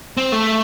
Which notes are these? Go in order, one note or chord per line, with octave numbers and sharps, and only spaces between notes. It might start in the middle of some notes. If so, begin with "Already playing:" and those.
C4
A3